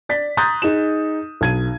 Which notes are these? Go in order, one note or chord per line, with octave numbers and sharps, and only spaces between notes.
D5 A6 B6
A#5 C6 D#6 F#6 G6 A6
D#4 G#4 E7
B1 G#6 D#7